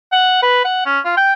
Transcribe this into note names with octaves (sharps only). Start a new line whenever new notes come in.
F#5
B4
F#5
C#4
F4
G5